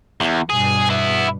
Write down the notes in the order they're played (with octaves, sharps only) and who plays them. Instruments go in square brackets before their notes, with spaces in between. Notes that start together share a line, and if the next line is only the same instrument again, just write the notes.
[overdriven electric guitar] E2
[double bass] G2 B2 [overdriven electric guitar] G#4
[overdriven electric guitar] B3 E4